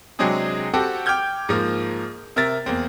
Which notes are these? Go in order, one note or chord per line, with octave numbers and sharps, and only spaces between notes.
C3 F#3 G#3 C4 D4 G#4
C4 F#4 G4 A4
G5 D6 F6 G6 G#6
G#2 F3 A#3
C3 A#4 E5 A6
E2 A#3 C4